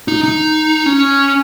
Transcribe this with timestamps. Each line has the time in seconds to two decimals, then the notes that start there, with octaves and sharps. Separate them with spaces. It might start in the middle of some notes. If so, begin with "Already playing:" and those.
0.08 D#4
0.24 D#4
0.86 C#4